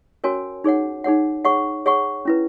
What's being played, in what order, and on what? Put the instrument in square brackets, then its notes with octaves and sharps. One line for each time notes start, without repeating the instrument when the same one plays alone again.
[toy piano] C#4 F#4 A#4 C#5 G#5
D#4 G#4 C#5 F#5
D#4 G#4 C#5 F#5
G#4 C#5 F#5 C#6
G#4 C#5 F#5 C#6
C#4 E4 B4